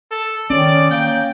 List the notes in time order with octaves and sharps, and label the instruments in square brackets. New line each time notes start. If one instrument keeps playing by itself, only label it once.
[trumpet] A4
[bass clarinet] D#3 [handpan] C#4 [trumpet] D5
[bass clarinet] A#3 [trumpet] G5